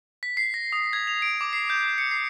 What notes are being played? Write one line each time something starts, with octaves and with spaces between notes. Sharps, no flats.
B6
C7
A#6
D#6
G#6
F7
D7
D6
C7
G6
C#7
C7